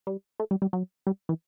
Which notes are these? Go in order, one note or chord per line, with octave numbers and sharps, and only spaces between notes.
G3
A3
G3
G3
F#3
G3
E3